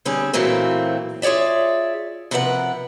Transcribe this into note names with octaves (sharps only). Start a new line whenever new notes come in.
D3 G3 C4 C#4 G#4
A#2 E3 F#3 A3 A#3 C4
F4 G#4 C#5 D5 E5
C3 F3 A#4 B4 E5 F#5